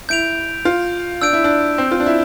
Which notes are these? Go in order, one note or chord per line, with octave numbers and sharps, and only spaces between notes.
E4 G6 D7 F7
F4
D4 E6 G6 D7
E4
D4
C4
F4
D4
E4